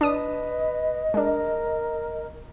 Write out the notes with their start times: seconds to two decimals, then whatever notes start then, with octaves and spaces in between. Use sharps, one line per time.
0.01 D4 B4 D#5 D#6
1.14 G#3 D4 A#4